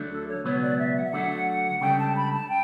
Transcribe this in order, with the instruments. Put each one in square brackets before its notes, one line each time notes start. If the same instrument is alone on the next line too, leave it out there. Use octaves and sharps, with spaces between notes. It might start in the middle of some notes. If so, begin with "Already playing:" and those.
Already playing: [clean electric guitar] D2 D3 F#3 A3 D4
[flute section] A4
C#5
[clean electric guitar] C#2 B2 F#3 B3 [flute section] C#5
[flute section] D5
E5
F#5
E5
[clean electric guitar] D3 F#3 A3 D4 A4 [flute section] F#5
[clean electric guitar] C#2 C#3 G3 D4 A4 [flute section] G5
[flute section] A5
B5
A5
G5